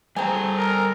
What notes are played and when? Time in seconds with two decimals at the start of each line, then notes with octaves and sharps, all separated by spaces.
0.16 G3 C4 G#4 A4 G#5 A#5
0.58 A#4